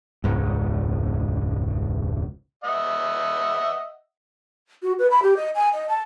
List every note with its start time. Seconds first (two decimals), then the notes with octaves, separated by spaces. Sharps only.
0.24 E1 C#2 G#2
2.64 D#5 E5 F#5
4.83 F#4
4.99 B4
5.10 B5
5.22 G4
5.37 D#5
5.55 G#5
5.73 D#5
5.89 A5